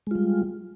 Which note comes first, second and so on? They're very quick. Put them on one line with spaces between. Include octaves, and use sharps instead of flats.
G#3 F4 G3